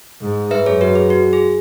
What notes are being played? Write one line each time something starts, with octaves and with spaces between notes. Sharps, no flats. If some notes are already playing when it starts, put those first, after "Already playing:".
G#2
B4 E5
F#2 G#4 C#5
F#4 B4
G#4
F#4
G#4